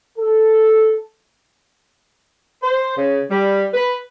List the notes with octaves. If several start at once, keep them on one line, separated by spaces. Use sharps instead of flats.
A4
C5
C#3
G3
B4